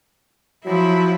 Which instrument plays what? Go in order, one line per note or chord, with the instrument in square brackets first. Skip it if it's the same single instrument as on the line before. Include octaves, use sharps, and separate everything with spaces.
[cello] F3 E4 [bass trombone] F#3